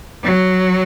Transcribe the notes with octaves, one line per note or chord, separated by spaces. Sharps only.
F#3